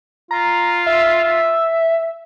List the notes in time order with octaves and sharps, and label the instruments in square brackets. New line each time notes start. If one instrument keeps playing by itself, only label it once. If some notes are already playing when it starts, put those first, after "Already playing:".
[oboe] F4 [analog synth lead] A#5
[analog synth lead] E5